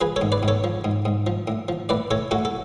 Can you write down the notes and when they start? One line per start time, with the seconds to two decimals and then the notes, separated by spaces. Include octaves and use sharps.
0.01 F3 G#4 B4
0.16 A4 C#5
0.22 G#2
0.32 B4 D5
0.43 G#2
0.48 A4 C#5
0.64 F3
0.84 G#2
1.05 G#2
1.27 F3
1.48 A2
1.68 F3
1.89 A2 B4 D5
2.11 A2 A4 C#5
2.31 A2 F#4 A4
2.45 A4